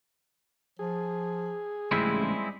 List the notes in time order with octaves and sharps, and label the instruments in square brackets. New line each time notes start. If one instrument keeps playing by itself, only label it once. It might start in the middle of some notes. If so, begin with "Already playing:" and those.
[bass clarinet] F3 [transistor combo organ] G#4
[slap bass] A1 G#2 C#3 [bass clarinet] G3 [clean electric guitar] G#3 C4 E4